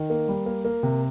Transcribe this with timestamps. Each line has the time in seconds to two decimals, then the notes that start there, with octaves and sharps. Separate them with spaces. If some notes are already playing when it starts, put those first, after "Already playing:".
Already playing: D#3
0.10 A#3
0.28 G3
0.46 A#3
0.65 A#3
0.83 C3